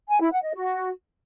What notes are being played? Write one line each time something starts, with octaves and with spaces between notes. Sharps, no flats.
G#5
E4
F#5
D#5
F#4